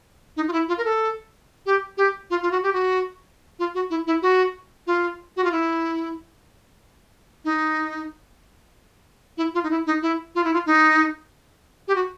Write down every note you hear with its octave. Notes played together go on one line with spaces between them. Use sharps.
D#4
F4
E4
F4
A#4
A4
G4
G4
F4
F4
F#4
G4
F#4
F4
F#4
E4
E4
F#4
F4
F#4
F4
E4
D#4
E4
F4
D#4
E4
D#4
E4
F4
E4
F4
D#4
G4
F#4